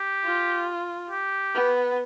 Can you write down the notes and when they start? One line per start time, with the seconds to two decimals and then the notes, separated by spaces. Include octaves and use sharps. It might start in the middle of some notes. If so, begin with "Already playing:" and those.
Already playing: G4
0.24 F4
1.10 G4
1.55 B3